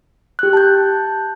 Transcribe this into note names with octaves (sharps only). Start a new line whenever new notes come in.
G4 F#6
A5 G6